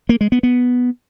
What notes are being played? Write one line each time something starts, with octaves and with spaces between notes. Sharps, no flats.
A#3
G#3
B3
B3